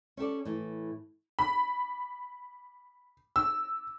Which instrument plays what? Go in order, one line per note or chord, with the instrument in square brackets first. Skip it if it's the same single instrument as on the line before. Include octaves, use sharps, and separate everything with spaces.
[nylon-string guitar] C#4 G4 A4 D5
A2 E3
[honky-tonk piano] B5
E6